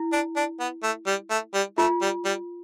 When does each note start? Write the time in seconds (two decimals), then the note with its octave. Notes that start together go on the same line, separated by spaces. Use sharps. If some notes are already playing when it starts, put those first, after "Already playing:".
Already playing: E4
0.12 D4
0.36 D4
0.60 B3
0.83 A3
1.07 G3
1.30 A3
1.54 G3
1.78 A3 F4
2.02 G3
2.25 G3